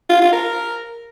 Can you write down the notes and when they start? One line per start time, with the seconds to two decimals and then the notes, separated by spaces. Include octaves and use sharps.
0.10 F4
0.21 F4
0.33 A#4